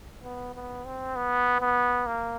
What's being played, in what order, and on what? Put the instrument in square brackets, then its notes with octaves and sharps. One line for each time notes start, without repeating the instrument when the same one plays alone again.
[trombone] B3
B3
C4
B3
B3
A#3